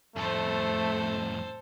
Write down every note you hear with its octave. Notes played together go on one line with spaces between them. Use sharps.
F2 A2 A3 A4 C5